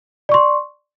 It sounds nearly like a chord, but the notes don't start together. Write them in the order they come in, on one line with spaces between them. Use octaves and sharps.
D5 C#6 C6